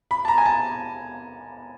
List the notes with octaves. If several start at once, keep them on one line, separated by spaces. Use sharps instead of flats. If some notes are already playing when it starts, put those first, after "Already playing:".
B5
A5
A#5
G#5
A5